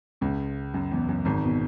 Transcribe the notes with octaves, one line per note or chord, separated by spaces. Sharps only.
C#2 C#3
F#2
E2
F#2
G#1 G#2
B2